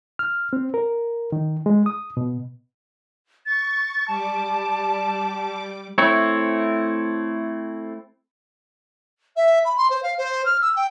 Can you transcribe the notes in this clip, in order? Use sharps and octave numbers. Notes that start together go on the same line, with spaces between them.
F6
C4
A#4
D#3
G#3
D#6
B2
C#6 A6
G3 A5 D6
A3 C4 E4 C#5
E5
B5
C6
C5
F5
C5
F6
E6
G5